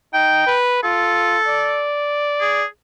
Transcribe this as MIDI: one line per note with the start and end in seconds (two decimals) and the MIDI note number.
0.14 0.41 63
0.14 0.56 79
0.46 0.81 71
0.84 1.38 65
0.84 1.85 69
1.47 2.65 74
2.40 2.65 68